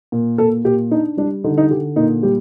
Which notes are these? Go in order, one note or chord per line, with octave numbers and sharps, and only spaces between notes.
A#2
A#2 A4
A#2 G4
D4 D#4
G3 D4
D3 D#4
D#4
D3 G4
A#2 D#4
G3 G4